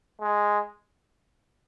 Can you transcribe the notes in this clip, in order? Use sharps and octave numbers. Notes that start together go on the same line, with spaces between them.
G#3